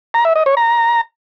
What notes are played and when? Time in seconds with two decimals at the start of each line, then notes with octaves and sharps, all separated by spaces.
0.14 A#5
0.25 E5
0.36 D#5
0.46 C#5
0.57 A#5